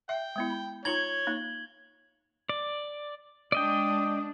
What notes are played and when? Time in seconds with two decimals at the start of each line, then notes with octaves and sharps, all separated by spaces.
0.09 E5 G5
0.36 G#3 B3 E4
0.50 B5
0.85 D#4 F4 C#5 A#5 G#6 F#7 G7
1.27 A#3 D#4
2.49 D5
3.52 G#3 D4 D5 D#5 G5 D#6